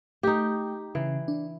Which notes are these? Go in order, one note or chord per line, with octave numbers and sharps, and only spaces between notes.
A3 D#4 G4 G5
C#3 E3
D4